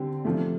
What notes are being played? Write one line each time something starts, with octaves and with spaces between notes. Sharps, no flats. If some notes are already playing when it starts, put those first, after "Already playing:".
Already playing: D3 G3 C4 G4
C3 F3 A3